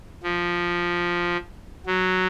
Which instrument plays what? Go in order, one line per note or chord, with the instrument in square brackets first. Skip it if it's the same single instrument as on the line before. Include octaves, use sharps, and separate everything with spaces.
[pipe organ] F3
F#3